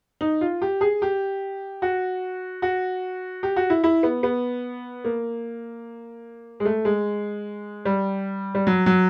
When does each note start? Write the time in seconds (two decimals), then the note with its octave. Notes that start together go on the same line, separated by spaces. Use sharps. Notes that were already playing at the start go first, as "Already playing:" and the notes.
0.21 D#4
0.41 F4
0.62 G4
0.81 G#4
1.02 G4
1.82 F#4
2.62 F#4
3.43 G4
3.56 F#4
3.70 E4
3.84 E4
4.03 B3
4.23 B3
5.04 A#3
6.60 G#3
6.65 A3
6.85 G#3
7.85 G3
8.55 G3
8.67 F#3
8.86 F#3